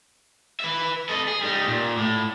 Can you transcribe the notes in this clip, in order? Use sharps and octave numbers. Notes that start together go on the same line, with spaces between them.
B4 E5
A4 D#5
G#4
G3 D#4
A#2
A2